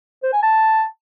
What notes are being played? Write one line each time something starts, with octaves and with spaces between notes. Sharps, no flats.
C5
G#5
A5